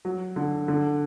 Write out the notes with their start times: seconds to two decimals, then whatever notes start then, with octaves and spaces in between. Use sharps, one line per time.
0.05 F#3
0.36 D3
0.68 D3